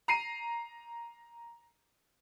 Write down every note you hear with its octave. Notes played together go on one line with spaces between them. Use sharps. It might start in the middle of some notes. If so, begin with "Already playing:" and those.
A#5 C7 D#7